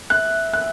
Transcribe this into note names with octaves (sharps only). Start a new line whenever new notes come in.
E5 F#6
F#6